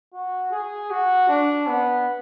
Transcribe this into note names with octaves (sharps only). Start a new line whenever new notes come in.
F#4
G#4
F#4
D4
B3